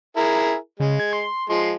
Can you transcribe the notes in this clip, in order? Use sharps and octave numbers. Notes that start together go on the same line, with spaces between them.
E4 G#4 A#4
C#3 G#3
G#6
C6
F3 G#3 C6